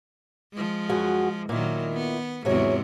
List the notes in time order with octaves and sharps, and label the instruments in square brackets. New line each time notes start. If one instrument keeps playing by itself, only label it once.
[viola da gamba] F3 G#3
[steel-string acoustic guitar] F#2 F#4 G#4
[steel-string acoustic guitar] A#2 E4 [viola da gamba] D#3 F#3
[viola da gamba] B3
[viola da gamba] E2 G#2 C3 [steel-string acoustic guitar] F#3 G#4 C#5